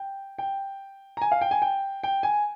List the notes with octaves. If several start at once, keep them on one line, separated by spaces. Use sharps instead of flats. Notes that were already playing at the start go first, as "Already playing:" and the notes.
Already playing: G5
G5
A#5
G#5
F5
G5
G#5
G5
G5
G#5